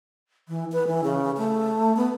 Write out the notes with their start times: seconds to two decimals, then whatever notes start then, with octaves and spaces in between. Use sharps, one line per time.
0.49 E3
0.72 B4
0.87 E3
1.04 C#3
1.37 A3
1.96 B3